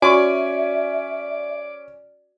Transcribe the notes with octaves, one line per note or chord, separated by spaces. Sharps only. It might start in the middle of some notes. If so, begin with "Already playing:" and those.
C#4 F#4 D5 E5 G#5 C#6